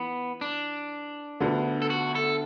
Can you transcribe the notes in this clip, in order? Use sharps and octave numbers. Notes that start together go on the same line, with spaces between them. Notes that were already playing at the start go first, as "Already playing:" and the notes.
Already playing: E3 B3
D4
D2 D3 B3
A4
F#4
A4